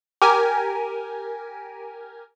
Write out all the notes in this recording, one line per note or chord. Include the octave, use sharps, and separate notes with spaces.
G4 A#4 G#5